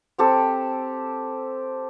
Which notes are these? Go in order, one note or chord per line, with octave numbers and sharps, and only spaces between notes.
C4 G4 A4